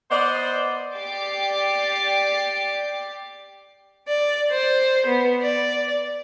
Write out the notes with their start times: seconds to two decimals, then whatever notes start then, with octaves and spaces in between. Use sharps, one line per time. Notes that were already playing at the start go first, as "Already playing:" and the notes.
0.10 B3 C5 D5 D#5
0.97 G4 D5 D6 C7
4.08 D5
4.51 C5
5.06 B3
5.42 D5